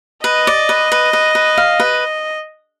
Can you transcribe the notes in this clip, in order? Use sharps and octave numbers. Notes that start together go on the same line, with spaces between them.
B4 D#5
D5
B4
B4
B4
B4
F5
B4